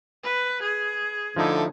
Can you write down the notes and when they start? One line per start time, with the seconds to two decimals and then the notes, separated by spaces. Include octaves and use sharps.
0.24 B4
0.63 G#4
1.36 D3 F3 A3 D#4 E4